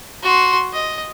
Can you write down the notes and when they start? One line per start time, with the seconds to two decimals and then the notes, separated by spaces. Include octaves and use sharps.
0.23 F#4 C6
0.73 D#5